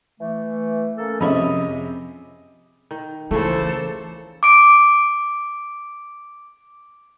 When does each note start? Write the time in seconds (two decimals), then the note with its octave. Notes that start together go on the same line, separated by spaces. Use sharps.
0.20 E3 A3
0.98 A#3 C#4 A4
1.21 F2 C3 C#4 G#4 D#5 E5 B5
2.91 D#3
3.31 C#3 E3 F3 A3 A#3 A4 C5
4.43 D6 D7